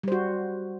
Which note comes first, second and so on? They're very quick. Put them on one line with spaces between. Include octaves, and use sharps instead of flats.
G3 C5 F#4